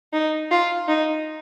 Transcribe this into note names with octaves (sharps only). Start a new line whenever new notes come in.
D#4
F4
D#4